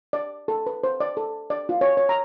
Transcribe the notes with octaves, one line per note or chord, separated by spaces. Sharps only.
D5
A4
B4
C5
D5
A4
D5
F4
C#5
C#5
A#5